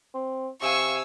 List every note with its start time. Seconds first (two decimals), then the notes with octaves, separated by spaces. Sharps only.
0.14 C4
0.62 C3 F5 G#5 C#6 E6